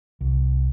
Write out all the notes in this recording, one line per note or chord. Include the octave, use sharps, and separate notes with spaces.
C2